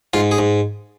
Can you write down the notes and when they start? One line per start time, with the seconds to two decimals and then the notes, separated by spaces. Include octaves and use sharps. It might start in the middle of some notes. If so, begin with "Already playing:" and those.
0.13 G#2 F4
0.31 G#4
0.38 G#2